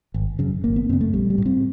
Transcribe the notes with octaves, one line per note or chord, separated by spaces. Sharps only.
G#1
F#2 C#3
G#1 A#3
B3
F#2 C#3 C4
A3
A#1 G3
G3
A2
C4